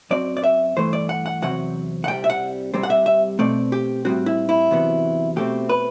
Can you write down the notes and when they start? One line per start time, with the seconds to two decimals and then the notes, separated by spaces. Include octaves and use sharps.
0.11 F#2 F#3 C4 D5
0.37 D5
0.44 E5
0.76 G2 E3 A3 C5
0.93 D5
1.09 F#5
1.26 F#5
1.42 E2 C3 F#3 C4 F#5
2.04 F#5
2.08 C2 C3 G3 G5
2.24 E5
2.30 F#5
2.74 C2 C3 G3 C4
2.83 F#5
2.90 E5
3.06 E5
3.39 B2 A3 C4 D5
3.72 G4
4.05 A2 G3 C4 F#4
4.26 E4
4.49 E4
4.71 E2 C3 F#3 B3
5.36 B2 A3 C4 G4
5.69 B4